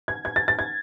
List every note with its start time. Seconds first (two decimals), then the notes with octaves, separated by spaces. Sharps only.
0.08 G#6
0.25 G#6
0.36 A6
0.48 A6
0.59 G#6